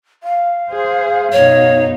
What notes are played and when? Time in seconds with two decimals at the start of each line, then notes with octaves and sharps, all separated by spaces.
0.23 F5
0.69 G#4 C5
1.32 F#2 B2 D#4 C#5